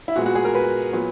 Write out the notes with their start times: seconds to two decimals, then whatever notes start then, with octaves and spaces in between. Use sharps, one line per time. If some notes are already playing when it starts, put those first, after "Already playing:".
0.08 E4
0.16 A#2 G#3 B3 F#4
0.26 F#4
0.35 G#4
0.45 A#4
0.55 B4
0.93 A#2 F#3 B3